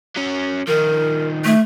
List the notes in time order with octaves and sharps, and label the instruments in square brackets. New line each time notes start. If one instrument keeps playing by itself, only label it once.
[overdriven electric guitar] F#3 C#4
[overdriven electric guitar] D#3 F3 [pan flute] A#4
[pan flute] A3